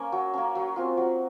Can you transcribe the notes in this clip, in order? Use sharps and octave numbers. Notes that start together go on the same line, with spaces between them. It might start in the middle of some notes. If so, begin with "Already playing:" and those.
Already playing: A#3 C#4
F#3
A#3 C#4
F#3
C4 F4
F#3